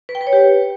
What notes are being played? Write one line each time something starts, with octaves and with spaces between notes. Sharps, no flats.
B4
G5
B4
C#5
G4